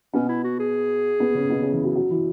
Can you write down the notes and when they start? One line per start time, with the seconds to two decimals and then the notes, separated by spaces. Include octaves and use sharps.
0.13 B2 B3 C#4
0.29 E4
0.44 F#4
0.59 G#4
1.20 B2 B3
1.35 C#3 C#4
1.50 B2 B3
1.61 C#3 C#4
1.72 E3 E4
1.84 F#3 F#4
1.95 F#3 F#4
2.11 E3 E4